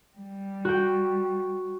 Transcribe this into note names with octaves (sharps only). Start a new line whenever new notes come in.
G3
F#4 G5